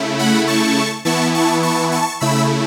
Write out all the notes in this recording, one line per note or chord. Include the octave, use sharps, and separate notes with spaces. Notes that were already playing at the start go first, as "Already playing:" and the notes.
Already playing: C#3 A3 E4
F#5 B5
A5 C#6
E3 B3 E4 A5 C#6
A5 C#6
A5 C#6
A5 C#6
C#3 A3 E4 B5 E6